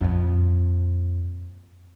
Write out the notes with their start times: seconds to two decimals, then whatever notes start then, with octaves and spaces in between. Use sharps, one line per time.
0.01 F2 A#2